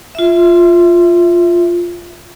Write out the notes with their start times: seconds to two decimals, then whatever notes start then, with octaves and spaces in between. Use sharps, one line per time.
0.15 F4 E5